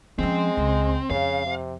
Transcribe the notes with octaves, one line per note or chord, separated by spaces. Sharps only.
F3 G#3 C4 C#4
C#2
F2 C#3 F5
C3